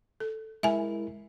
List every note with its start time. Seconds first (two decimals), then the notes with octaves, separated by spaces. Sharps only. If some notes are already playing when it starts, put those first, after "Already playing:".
0.20 A4
0.63 G#3 E4 A#4 E5 G#5